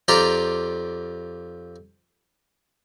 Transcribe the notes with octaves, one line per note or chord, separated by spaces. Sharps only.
F2 F4 G4 D5 A#5